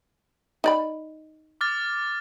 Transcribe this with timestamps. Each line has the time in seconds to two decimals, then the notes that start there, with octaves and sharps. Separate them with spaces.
0.64 D#4 D5 B5
1.61 D6 F6 A6